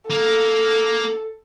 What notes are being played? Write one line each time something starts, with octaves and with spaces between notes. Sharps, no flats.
A#3 A4